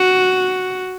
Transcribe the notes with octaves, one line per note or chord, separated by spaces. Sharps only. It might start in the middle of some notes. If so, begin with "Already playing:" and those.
Already playing: F#4